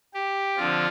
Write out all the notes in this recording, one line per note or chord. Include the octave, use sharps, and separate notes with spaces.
G4
D3 F3 C4 F4